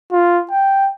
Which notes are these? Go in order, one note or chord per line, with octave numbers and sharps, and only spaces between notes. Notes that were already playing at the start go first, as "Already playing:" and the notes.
F4
G5